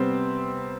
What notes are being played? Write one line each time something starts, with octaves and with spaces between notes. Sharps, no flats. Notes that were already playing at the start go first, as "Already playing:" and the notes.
Already playing: C3 G3 B3 C4 C5